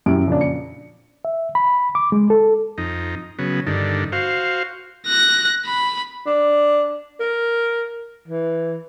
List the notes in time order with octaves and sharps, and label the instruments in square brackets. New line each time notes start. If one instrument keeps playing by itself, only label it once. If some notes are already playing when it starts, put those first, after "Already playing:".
[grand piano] F#2 E4 G4 D7
F2 A#2 C#3 C#4 D4
C#7
[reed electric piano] E5
B5
D6
G#3
A4
[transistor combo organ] F2 D#4
C#3 F#3 B3
G2 D3 D#3
F#4 C5 F5
[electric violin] F#6 A#6
B5
[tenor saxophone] D4
A#4
E3